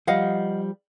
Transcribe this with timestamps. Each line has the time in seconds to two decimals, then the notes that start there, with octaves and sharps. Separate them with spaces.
0.07 F3 G3 D#5 F5 F#5